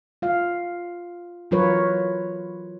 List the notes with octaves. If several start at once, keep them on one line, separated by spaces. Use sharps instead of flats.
F4 F5
E3 F#3 F4 A#4 B4 C#5